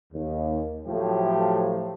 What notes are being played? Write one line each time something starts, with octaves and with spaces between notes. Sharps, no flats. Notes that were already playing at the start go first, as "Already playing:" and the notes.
D#2
A2 F3 F#3 A3 G4